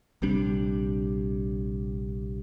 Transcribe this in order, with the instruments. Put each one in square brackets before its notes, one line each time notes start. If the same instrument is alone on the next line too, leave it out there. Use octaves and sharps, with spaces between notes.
[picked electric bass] A#1 C3 G3 D4